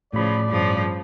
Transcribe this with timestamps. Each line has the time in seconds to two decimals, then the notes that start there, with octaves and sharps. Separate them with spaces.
0.13 A2 C#3 F3 D5 B5
0.49 G2 C#3 F3